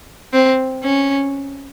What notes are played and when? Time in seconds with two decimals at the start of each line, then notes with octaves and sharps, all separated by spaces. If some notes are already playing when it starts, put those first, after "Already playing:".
0.33 C4
0.84 C#4